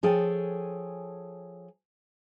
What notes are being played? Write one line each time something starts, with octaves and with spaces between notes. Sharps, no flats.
F3 G#4 A4 C#5 G5 G#5